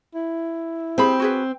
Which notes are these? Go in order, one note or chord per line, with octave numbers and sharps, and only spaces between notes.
E4
C4 G4 G#4 B5
F#4 G#4 B4